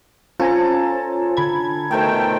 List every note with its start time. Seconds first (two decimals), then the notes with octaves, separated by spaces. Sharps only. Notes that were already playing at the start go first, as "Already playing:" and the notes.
0.40 C#4 F4 A4 C5 G#5 A#5
1.37 D3 B5 G#6
1.91 B2 D#3 A3 A4 C5 G5